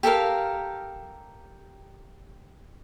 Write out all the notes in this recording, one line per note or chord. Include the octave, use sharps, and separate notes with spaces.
G4 A4 A#4 F5